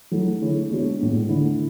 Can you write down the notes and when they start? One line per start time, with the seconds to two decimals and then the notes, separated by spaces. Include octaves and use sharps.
0.11 F#3 A3 E4 A4
0.41 D3 A3 E4 G#4 C#5
0.70 G#3 B3 D4 F#4 C#5
0.99 A2 G#3 B3
1.28 D3 A3 E4